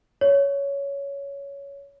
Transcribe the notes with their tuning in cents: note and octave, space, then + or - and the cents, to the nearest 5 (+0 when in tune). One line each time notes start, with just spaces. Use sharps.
C#5 +15